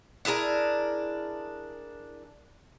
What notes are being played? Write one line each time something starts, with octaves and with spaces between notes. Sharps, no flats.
D4 E4 G#4 A#4